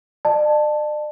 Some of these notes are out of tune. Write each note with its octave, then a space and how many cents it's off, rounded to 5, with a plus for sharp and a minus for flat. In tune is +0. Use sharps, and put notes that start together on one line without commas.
D5 +40 A5 +0